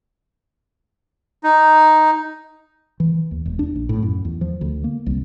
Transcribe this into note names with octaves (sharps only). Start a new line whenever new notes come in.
D#4
E3
D#2
E1
D4
A#1
A2
F#2
E2
F3
D2
A#3
C2